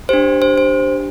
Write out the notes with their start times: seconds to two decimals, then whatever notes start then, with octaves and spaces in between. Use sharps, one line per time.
0.09 D4 G4 C5
0.42 C5
0.58 C5